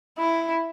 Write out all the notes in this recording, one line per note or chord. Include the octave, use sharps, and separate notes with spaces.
E4